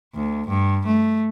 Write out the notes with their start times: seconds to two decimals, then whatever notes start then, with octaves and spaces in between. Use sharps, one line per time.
0.15 D2
0.48 G2
0.86 A3